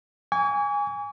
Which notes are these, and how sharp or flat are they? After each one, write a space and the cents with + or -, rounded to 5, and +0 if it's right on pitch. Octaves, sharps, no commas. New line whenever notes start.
G#5 -15 C#6 +45